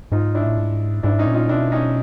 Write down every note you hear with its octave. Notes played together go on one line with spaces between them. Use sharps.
G#2 D#4 F4
D4 E4
A2
G#2
G#2 D4 E4
C#4 D#4
A#2
D#4 F4
B2 D4 E4
C#4 D#4